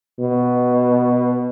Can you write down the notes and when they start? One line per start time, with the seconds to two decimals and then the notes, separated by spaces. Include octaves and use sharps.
0.20 B2